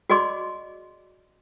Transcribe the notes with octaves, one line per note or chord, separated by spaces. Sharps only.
F#4 G#4 D5 D#5 C6 D6